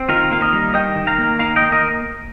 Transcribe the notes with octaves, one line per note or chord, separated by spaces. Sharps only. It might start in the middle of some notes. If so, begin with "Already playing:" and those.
Already playing: C4
D#3 F4 A#4
A#3 F5
A#4 D#5
G3
D#3 D#5 G5
D#3
F5 A#5
A#3
D#3 F5 A#5
D#5 G5
A#3
A#4 D#5